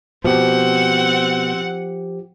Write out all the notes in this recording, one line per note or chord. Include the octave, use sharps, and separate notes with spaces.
B2 F3 C4 G4 F#5